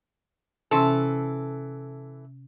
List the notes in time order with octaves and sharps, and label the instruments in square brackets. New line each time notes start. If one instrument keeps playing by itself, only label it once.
[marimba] C3 C#4 C6 [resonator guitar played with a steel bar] E3 A4